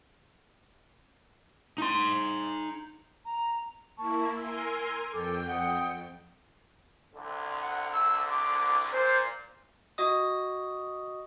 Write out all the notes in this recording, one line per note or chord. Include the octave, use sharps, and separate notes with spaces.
D#4 C6
A#5
A#3 E4 A5 C#6
A#4 G#5 C6 E6
F2 A4 G5 D6
F#5 D#6
C2 D3
F#5
E6
D6
A#2 C5
F#4 D#5 D#6